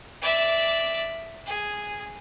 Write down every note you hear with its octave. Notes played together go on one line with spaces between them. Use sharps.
D5 E5
G#4